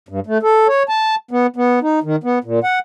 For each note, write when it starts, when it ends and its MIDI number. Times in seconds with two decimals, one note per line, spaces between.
0.09 0.20 43
0.26 0.38 57
0.43 0.67 69
0.68 0.83 73
0.89 1.15 81
1.31 1.47 59
1.56 1.79 59
1.82 1.99 63
2.03 2.16 51
2.24 2.39 59
2.44 2.59 46
2.64 2.79 78